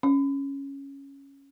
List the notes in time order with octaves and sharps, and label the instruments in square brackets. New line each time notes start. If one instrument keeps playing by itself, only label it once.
[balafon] C#4